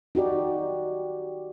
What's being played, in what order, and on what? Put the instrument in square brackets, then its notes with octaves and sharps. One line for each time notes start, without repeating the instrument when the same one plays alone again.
[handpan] D#4 F#4 G4 D5